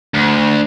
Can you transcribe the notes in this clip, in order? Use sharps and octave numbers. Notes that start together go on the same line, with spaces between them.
D2